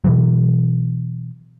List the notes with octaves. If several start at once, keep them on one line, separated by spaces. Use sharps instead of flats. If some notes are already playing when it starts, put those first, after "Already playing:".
B2 E3 F#3